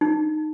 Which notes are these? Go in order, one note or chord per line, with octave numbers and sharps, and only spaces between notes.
D#4